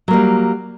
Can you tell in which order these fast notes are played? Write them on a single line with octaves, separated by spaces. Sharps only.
F#3 A#3 G3